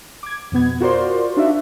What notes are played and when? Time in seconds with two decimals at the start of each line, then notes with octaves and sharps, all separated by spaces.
0.23 D6 G#6
0.52 F2 B2 B3 G#6
0.80 F4 F#4 A#4 C5 D5 C6
1.37 D4 D#4 F4 F#4 E5